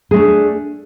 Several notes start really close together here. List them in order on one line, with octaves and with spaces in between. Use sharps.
G#4 A3 D4